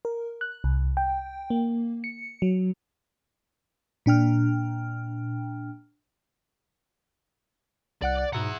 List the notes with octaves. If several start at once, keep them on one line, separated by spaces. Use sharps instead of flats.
A#4
F#6
C2
G5
A#3
C#7
F#3
A#2 D4 G5 F6
C2 D5 F#5 F#6
G#2 B2 E4 F#5 A#5